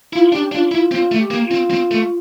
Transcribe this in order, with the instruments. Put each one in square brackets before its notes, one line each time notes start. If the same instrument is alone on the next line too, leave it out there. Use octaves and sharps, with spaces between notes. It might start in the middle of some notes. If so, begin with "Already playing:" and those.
[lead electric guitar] E4 [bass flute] F4
[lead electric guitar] D4 [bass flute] G4
[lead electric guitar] D4 [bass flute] F4
[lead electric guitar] E4 [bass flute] F4
[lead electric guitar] C4 [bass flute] F4
[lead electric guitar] A3
[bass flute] G4
[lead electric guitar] A#3
[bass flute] F4
[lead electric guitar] C4
C4
A3